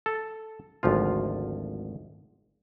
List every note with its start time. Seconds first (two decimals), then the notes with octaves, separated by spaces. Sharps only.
0.06 A4
0.83 G#1 D2 F3 F4